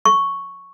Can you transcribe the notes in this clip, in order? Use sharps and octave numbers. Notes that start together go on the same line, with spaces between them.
C#6